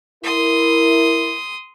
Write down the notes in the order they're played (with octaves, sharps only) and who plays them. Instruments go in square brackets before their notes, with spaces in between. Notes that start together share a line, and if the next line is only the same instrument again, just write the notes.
[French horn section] E4 A#4 [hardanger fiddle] C6 D#6